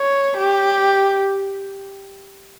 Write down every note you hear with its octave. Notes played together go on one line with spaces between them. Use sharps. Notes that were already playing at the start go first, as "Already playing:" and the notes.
Already playing: C#5
G4